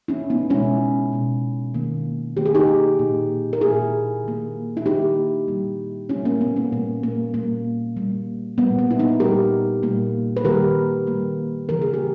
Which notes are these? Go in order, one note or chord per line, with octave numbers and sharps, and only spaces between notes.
C#4 E4
B3 D#4
B2 G#3 C#4 E4
B2 G#3
D#3 A#3
D#3 A#3 G4
G#4
D#4 G4
A#2 A#3
A#4
A#2 A#3 E4 G#4
D#3 A#3
E4
D#3 A#3 D#4 G4
A#2 G3 A#3
A#2 G3 A#3 C#4 E4
A#3 C#4
B3
A#3 C#4
A#2 G3 A#3
A#3
A#2 G3 A#3
A#2 G3 A#3
A#2 G3 A#3 B3
B3
E4
B3 D#4
A#2 G3 A#3 G4 A#4
A#2 G3 A#3
B4
D#3 G3 A#3 G4 A#4
D#3 G3 A#3
C#3 E3 A#3 A#4
G#4
G4